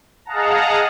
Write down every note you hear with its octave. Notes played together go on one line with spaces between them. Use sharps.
G#4 D#5 F5 F#5 A5 A#5